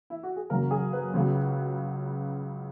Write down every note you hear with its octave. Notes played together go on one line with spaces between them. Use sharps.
E4
F#4
G#4
F#2 C#3 F#3 A#3 A#4
G#4
B4
C#2 C#3 F#3